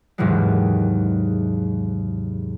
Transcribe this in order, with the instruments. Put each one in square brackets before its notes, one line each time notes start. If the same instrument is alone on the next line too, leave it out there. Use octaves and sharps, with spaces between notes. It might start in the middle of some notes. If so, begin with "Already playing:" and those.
[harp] D#2 G#2 C3 E3 F#3 G#3